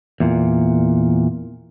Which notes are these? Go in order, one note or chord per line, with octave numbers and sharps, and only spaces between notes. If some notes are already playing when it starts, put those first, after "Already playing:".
E2 A#2